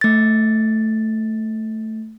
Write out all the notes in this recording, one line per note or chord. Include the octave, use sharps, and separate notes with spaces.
A3 A6